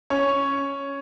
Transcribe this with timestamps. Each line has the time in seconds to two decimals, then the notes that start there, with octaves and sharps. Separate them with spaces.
0.10 C#4 C#5